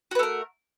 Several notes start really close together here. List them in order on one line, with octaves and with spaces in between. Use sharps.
F#4 B4 A3 A#4